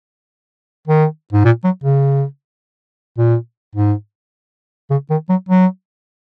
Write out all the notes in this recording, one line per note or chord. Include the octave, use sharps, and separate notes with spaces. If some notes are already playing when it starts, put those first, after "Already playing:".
D#3
G#2
A#2
F#3
C#3
A#2
G#2
C#3
D#3
F#3
F#3